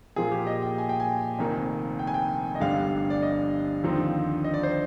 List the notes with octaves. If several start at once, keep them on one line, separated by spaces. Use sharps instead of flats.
A#2 F3 A#3 F4 G#4
G4
D#5
G5
G#5
G5
G#5
F1 F2 D#3 A#3 D#4
G5
G#5
G5
D#5
G1 G2 D3 G3 F5
D5
D#5
D#2 D3 F3 C4 D#4
D#5
D5
C5